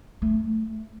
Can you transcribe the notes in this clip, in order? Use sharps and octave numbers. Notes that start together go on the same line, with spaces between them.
A3